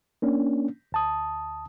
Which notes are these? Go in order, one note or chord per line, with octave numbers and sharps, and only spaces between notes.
A#3 C#4 D4
D2 A5 D#6